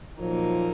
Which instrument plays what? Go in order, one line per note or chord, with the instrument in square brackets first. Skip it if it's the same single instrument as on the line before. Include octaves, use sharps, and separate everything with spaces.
[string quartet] A#2 F#3 A#3 D#4 [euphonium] F3